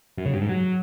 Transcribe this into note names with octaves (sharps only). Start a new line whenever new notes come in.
F#2
C#3
G2
G#2
F#3